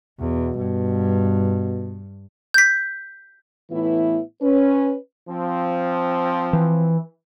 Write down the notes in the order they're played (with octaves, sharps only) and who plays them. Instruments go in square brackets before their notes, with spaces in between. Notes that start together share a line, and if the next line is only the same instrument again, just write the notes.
[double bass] E2 [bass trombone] B2
[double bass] G2
[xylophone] G6 B6
[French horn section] A2 E3 B3 E4
C#4 B4
[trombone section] F3 C4
[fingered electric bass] E3